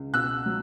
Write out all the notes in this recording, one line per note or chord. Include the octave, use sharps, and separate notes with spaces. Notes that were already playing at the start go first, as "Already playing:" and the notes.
Already playing: C#2
B2 E6 F#6
F#3